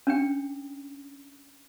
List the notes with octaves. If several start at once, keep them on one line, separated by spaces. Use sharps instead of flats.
C#4 D4 G5